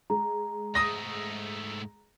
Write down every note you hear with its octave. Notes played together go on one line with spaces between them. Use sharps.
G#3 A#5
G#2 A3 D#6 A#6